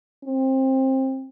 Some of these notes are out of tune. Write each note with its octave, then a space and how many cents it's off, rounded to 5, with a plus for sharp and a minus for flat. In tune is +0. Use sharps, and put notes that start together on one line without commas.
C4 +20